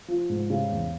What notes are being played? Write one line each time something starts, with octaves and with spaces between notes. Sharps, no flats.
F3
G#2
C#3
E2